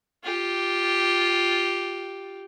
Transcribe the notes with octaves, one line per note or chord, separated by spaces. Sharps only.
F4 G4